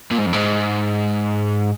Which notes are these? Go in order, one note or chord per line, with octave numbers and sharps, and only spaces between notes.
A#2
G#2
F2
G#2